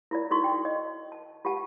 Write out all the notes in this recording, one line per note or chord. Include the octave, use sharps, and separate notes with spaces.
E4 F4 D5
D#4 E4 F#4 A4 C#6
G5
D#5
A5
F4 G4 F#5 A5